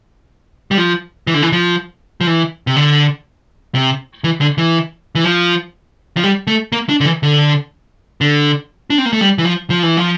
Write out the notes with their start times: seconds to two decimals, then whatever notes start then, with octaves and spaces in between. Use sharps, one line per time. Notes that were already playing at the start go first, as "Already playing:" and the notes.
0.71 G3
0.77 F3
1.27 E3
1.34 D3
1.42 E3
1.52 F3
2.21 F3
2.27 E3
2.67 C3
2.76 D3
3.75 C3
4.24 E3
4.41 D3
4.58 E3
5.15 E3
5.24 F3
6.17 F3
6.24 G3
6.47 A3
6.72 A#3
6.89 D4
7.01 D3
7.05 E3
7.23 D3
8.21 D3
8.90 D4
8.98 C4
9.05 A#3
9.13 A3
9.21 G3
9.38 E3
9.45 F3
9.70 F3
9.83 E3
9.97 F3